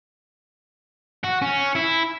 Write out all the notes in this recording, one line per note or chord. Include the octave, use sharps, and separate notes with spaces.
F#4
C#4
E4